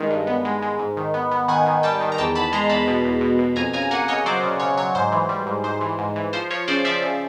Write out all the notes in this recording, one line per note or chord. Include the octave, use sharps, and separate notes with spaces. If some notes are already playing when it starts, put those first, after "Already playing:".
Already playing: G2 D#3 G#3
G2
B3
G#3
G#3
G#2
D#3
B3
B3
D#3 F#5 G#5
D#3
G3 G5 A5
D#3
A#5
E2 G5 A5
E2 A5 B5
G#3 A#5 C6
E2 A5 B5
B2
E2
B2
B2
F2 G#5 A#5
C#3 G#5 A#5
A#3 F#5 G#5
C#3 C#5 D#5
F#3 C5 D5
C#3
C#3 C#5
F#3 C#5
G#2 C5
E3
G3
G#2
G#2 C5
E3
G#2
E3
F3 C5
F3 C#5
C#3 C5 D5
F3 D5 E5
C#3